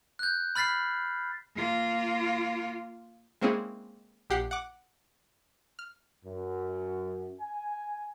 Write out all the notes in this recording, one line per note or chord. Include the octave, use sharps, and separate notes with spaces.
F#6 G6
B5 F6 A6 B6 C7
A#3 F4
G#3 A#3 C4 C#4 E4 G#4
A#1 G4 F#5 C7
F#5 D6
F6
F#2
G#5